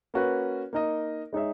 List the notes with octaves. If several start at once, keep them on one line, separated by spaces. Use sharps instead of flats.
A#3 C#4 F#4 B4
A#3 D#4 A#4 D#5
G#3 D#4 G#4 C#5 E5